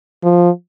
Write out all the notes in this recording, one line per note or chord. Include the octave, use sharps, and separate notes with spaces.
F3